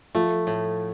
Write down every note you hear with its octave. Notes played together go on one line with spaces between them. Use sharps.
F3 A3
A2